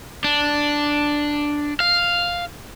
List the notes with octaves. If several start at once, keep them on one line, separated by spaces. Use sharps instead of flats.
D4
F5